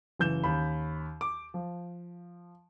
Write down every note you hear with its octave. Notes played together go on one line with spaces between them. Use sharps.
F#1 E3 G6 E7
D#2 B5
D6
F3